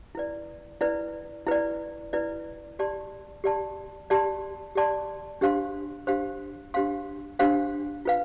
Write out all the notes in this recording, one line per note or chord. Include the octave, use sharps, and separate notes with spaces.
E4 B4 D5
E4 B4 D5
E4 B4 D5
E4 B4 D5
G4 D5 A5 C6
G4 D5 A5 C6
G4 D5 A5 C6
G4 D5 A5 C6
D4 G4 C5 F5 C6
D4 G4 C5 F5 C6
D4 G4 C5 F5 C6
D4 G4 C5 F5 C6
F4 B4 F5